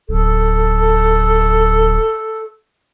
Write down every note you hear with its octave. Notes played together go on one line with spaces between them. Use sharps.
D1 A4